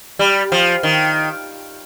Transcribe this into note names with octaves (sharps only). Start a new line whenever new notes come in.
G3
F3
D#3